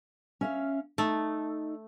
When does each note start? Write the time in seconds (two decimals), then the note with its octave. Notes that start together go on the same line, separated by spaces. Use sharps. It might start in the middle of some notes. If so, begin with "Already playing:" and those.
0.41 C#4 E5 F5
0.98 A3 D#4